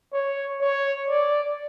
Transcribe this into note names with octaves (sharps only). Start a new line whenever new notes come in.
C#5
C#5
D5